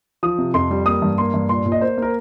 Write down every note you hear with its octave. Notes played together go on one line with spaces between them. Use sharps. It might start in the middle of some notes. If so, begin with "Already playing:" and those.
F3 D#6
C3
F2 C6
G3
A#3 D#6
G2
A#3 C6
G2
A#2 C6
A#2
D#5
A#3 C5
A#3 A#4